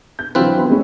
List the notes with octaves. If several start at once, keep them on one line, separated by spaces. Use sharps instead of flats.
G6
D3 E3 F#3 C4 F4 B4
E3 B3 B5
G#3 A3 C#4